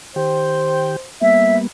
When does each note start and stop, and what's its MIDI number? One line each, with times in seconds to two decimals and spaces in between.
0.16 0.96 51
0.16 0.96 67
0.16 1.10 72
0.16 0.96 79
1.22 1.68 55
1.22 1.68 58
1.22 1.68 59
1.22 1.56 76